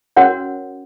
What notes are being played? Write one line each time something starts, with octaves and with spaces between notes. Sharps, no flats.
C#4 F#4 A#4 C#5 F#5